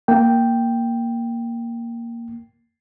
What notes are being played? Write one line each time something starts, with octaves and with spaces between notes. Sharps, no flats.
A#3 G5